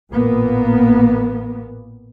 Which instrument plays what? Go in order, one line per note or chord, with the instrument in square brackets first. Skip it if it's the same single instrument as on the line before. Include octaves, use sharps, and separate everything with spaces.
[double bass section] A1 A#2 A#3 B3